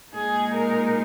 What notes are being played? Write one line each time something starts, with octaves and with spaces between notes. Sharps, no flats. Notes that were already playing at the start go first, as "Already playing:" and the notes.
A#2 G#3 D#4 G#4
A#4